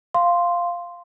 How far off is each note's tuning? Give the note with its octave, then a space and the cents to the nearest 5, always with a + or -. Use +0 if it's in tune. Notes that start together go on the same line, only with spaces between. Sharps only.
F5 +0 C6 +0